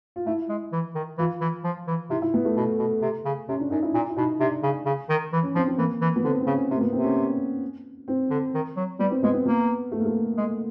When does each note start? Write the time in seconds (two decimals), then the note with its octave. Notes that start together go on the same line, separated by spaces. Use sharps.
0.16 F4
0.26 A3 E4
0.49 G#3
0.72 E3
0.95 D#3
1.18 E3 F4
1.41 E3
1.64 F3
1.87 E3
2.10 C3 E4
2.22 E4
2.34 B3
2.45 A3
2.57 B2
2.79 B2
3.02 C3
3.25 C#3
3.48 C3 C#4
3.60 D4
3.70 F#2 D#4
3.83 E4
3.94 A#2 E4
4.10 E4
4.16 B2 D#4
4.40 C3 D4
4.63 C#3
4.85 C#3
5.09 D#3
5.32 E3
5.43 C#4
5.55 F3 C4
5.67 C4
5.77 E3 A#3
6.01 E3
6.16 B3
6.23 D3 C4
6.41 C4
6.46 C#3 C#4
6.70 C3 C4
6.76 A#3
6.81 B3
6.93 C3 C4
7.04 C#4
8.08 C4
8.30 D3
8.54 D#3
8.76 F#3
8.99 G3 B3
9.10 C4
9.23 G#3 B3
9.33 C4
9.46 A#3 B3
9.92 A3
9.99 A#3
10.05 A3
10.37 G#3